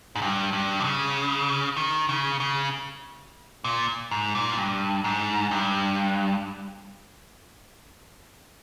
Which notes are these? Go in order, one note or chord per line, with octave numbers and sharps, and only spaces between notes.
G#2
G2
G2
C3
C#3
D#3
C#3
C#3
A#2
G#2
A#2
G#2
G2
G#2
G2